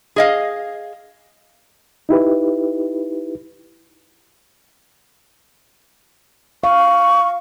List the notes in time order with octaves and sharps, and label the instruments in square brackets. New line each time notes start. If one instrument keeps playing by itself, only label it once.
[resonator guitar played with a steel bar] G#4 D#5 F5
[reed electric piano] D#4 E4 G4 B4
[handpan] F5 [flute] C#6